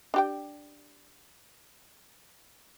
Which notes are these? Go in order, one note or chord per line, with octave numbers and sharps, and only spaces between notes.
D4 G4 G5